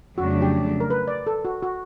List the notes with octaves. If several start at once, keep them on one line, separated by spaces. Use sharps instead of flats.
F2 C#3 F#3 A3 D4 F#4
G4
A#4
B4
D5
A4
F#4
F#4